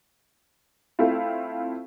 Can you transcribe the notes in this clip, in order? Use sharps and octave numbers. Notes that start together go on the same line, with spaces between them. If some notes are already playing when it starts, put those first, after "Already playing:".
A3 C4 E4 F4